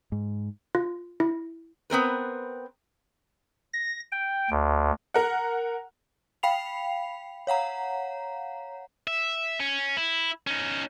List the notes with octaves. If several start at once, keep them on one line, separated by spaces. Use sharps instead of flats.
G#2
F4
E4
B3 C4 A#4 B4
A#6
G5
D2
A#4 F#5
F5 G5 B5 C7 F7
C#5 F5 F#5 A#5
E5
C#4
E4
C#4 D#4